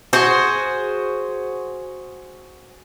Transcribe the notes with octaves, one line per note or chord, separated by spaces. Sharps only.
F#4 G#4 C5